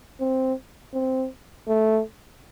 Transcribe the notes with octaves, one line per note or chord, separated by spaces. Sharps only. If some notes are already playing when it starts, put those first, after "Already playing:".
C4
C4
A3